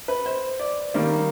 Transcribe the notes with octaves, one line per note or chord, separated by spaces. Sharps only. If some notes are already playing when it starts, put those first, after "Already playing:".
B4
C5
D5
D#3 G3 A#3